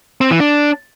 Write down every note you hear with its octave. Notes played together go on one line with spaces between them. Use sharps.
C4
E3
D4